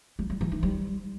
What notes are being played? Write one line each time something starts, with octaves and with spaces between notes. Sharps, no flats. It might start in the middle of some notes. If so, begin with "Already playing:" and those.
G3
G3
E3
D#4
G3